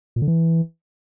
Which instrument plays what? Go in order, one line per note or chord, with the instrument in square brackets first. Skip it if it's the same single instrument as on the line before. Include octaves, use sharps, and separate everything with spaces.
[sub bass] A#2
D3
E3